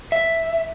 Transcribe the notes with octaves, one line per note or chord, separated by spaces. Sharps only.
E5